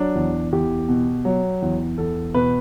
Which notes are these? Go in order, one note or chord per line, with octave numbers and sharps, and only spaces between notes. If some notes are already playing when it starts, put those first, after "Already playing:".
Already playing: F#3 D4
E2
E2 G4
B2
F#3
E2
E2 A4
B2 B4